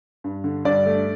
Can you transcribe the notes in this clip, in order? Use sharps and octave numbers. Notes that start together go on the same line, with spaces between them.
G2
D3
G2 D5
A3